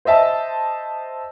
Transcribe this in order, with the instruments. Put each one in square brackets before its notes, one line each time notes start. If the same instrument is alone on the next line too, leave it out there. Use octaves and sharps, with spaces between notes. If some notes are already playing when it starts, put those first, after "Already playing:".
[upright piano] C5 D#5 E5 A5